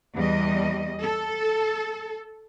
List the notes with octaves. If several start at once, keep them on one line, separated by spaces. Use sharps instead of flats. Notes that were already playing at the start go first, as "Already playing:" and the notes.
E2 G3 D#5
A4